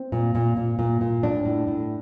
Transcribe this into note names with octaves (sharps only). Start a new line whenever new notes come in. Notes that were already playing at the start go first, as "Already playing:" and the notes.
Already playing: C4
A#2
A#2
A#2
A#2
A#2
A2 D4
A2
A2